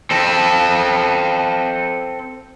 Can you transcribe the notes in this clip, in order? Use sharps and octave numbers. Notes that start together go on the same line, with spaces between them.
C4 A4